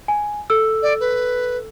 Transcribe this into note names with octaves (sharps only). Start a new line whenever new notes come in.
G#5
A4 E6
D5
B4